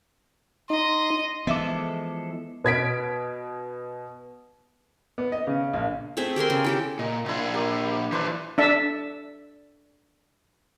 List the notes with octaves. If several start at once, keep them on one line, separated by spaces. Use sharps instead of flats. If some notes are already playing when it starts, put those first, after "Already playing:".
D#4 D#5 C6
E3 F3 G#3 B3 A4 D#5 E5 D6
B2 G#6 B6 D7
B3
D#5
C#3
A#1
A3 C4 G#4 E5
G4 G#4 A#4 C6
C#3
E4 G4 A4
A#2 D#5
A#2 F3 D4 E4
A#3 G4
E3 F3 D4 B4 C5
D4 E5 A5